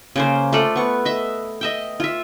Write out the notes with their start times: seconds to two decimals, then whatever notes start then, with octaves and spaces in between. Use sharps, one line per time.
0.16 C#3 A#3 C5
0.53 A3 F4 A4 D5
0.76 B3 C#6
1.05 D#5 E5
1.61 D#5 E5 G5
2.00 F4 E5